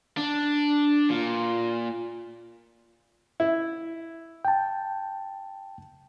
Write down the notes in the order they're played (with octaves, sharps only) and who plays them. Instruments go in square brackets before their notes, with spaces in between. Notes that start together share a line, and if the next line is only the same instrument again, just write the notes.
[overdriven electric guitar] D4
A#2
[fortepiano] E4
[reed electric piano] G5 A5